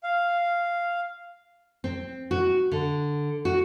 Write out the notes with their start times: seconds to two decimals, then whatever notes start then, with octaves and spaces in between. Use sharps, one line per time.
0.03 F5
1.84 C4
2.31 F#4
2.72 D3
3.45 F#4